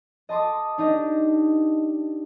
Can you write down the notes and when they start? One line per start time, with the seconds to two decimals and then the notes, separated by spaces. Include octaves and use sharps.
0.29 D#5 A5 C6 D6 D#6
0.78 D4 D#4 G4 D#5